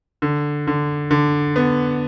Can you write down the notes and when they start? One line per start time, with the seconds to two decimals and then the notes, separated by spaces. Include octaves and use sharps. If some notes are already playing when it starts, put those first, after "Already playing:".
0.22 D3
0.67 D3
1.11 D3
1.56 B3